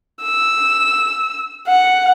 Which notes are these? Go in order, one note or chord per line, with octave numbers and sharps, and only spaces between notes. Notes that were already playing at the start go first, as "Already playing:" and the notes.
E6
F#5